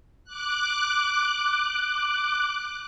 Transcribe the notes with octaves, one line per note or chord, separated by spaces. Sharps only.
D6 F#6